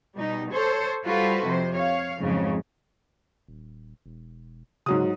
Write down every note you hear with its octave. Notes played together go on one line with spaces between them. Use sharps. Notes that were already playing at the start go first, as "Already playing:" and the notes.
B2 G3 D#4
A4 C5 C#5
G3 F4 F#4 A4 B4 C5
F2 C3 C5
C#5 F5
F2 G#2 C#3 F#3
D#1
E1
G#2 C#3 F#3 D#6